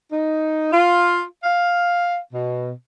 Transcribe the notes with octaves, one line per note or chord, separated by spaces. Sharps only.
D#4
F4
F5
B2